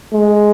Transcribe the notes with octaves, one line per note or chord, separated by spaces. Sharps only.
G#3